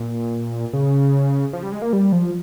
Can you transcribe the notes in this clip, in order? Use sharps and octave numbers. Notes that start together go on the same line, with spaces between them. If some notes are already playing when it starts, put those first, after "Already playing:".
Already playing: A#2
C#3
F3
G3
G#3
A#3
G3
F3